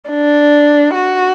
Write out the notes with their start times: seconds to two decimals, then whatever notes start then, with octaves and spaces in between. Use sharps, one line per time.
0.09 D4
0.95 F#4